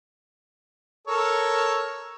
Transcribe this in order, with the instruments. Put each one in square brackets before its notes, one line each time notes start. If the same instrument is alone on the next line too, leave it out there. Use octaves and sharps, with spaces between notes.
[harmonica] A4 A#4 C#5